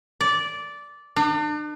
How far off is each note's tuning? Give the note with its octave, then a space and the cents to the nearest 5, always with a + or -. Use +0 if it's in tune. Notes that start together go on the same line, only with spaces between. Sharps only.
D5 -10
D4 +40